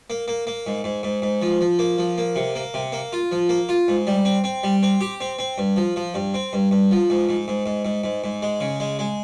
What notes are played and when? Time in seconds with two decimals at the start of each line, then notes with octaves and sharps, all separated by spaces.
0.10 A#3
0.28 A#3
0.47 A#3
0.67 G#2
0.84 G#2
1.03 G#2
1.22 G#2
1.41 F3
1.61 F3
1.79 A#3
1.98 F3
2.18 A#3
2.36 C3
2.55 A#3
2.74 C3
2.92 A#3
3.13 F4
3.31 F3
3.49 A#3
3.69 F4
3.88 G#2
4.07 G3
4.25 C4
4.44 C4
4.63 G3
4.83 C4
5.01 G4
5.20 C4
5.39 C4
5.58 G2
5.76 F3
5.96 F3
6.14 G2
6.34 C4
6.53 G2
6.71 G2
6.91 F3
7.10 G#2
7.29 G#2
7.48 G#2
7.66 G#2
7.85 G#2
8.04 G#2
8.24 G#2
8.43 G#3
8.61 C#3
8.80 G#3
8.99 G#3